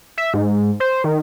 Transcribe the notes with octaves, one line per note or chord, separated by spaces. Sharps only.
E5
G#2
C5
D#3